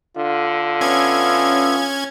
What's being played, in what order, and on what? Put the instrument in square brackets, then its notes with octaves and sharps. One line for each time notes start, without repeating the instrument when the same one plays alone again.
[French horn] D3 [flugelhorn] F4
[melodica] B3 E5 [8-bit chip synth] C#4 G#6